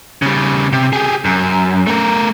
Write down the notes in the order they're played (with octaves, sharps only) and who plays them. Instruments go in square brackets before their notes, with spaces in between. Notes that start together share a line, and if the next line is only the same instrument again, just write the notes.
[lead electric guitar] C#3 G3
C3
G4 G#4
F#2
A3 A#4